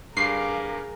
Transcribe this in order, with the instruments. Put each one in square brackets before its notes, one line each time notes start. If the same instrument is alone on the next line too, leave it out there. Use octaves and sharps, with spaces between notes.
[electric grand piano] G2 [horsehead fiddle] G#4 A#4 [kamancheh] F5 D6 [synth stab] C7